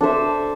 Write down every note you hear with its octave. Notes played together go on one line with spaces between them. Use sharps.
D4 A4 C5 E5